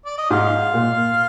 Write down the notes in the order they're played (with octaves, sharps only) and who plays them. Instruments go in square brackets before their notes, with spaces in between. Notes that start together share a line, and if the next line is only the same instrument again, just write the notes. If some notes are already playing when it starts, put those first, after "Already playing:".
[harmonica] D5
D#5
[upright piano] G#2 [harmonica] F4 F5
[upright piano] A#2